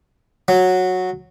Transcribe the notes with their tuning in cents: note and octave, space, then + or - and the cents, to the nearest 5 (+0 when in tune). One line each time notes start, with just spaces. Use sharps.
F#3 -10